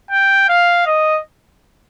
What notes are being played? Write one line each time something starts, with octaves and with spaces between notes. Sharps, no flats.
G5
F5
D#5